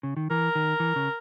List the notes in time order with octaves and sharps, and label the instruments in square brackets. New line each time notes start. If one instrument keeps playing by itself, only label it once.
[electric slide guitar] C#3
D#3
[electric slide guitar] E3 [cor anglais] A#4
[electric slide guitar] D#3
E3
C#3